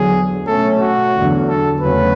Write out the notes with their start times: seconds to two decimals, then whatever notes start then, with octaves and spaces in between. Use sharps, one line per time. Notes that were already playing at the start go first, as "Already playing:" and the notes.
Already playing: E2 D3 F#3 G#4
0.47 B2 A3 C#4 A4
0.80 F#4
1.14 E2 D3 F#3
1.48 A4
1.80 E2 C#3 F#3 A3 C#4 B4